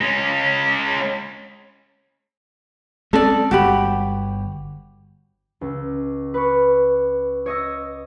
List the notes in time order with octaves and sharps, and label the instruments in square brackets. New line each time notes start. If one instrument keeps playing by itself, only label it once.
[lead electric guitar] G#3 C#4
[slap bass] G#3 C4 C#4 [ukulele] A4 D5
[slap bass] G1 [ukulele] F#4 G4 B5
[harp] C#2
B4 C#6
C#5 D#5 E6 A#6